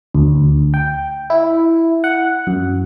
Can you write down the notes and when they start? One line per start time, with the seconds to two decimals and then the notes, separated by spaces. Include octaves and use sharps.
0.14 D2
0.74 G5
1.30 E4
2.04 F#5
2.47 F#2